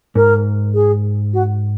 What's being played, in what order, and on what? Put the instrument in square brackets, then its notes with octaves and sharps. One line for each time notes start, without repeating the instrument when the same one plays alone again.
[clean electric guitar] G#2 [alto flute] A#4
[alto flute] G#4
F#4